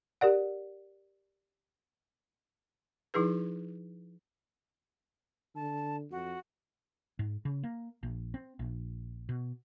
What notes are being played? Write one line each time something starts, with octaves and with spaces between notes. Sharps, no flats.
G4 A#4 D5 F#5
F3 D#4 E4 G#4 B4
D3 A5
F2 F#4
G#2
C#3
A#3
A#1
C4
A#1
B2